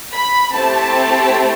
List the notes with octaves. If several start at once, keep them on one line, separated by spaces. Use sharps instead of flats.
B5
A3 C4 E4 G4 A5